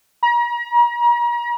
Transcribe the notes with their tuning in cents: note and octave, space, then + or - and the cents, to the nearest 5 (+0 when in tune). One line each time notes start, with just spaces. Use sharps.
A#5 +40